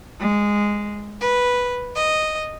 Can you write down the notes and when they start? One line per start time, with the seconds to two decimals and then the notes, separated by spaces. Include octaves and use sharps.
0.19 G#3
1.20 B4
1.95 D#5